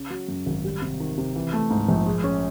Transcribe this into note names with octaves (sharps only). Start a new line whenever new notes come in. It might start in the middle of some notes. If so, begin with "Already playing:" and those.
Already playing: C#3
F#3
F#2
G#1
G3
C3
D#3
C3
E3
A3
G#2
A#1
G#3
C#4